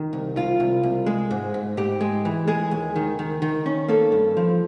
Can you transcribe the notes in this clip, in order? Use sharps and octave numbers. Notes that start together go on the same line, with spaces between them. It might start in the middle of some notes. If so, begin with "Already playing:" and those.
Already playing: D#3
C2
C2 F4
C2
C2
G#3
G#2
G#2
G#2 G4
G#3
E3
G#3 G#4
D#2
D#3
D#3
D#3
C#4
A#3 A4
G2
F3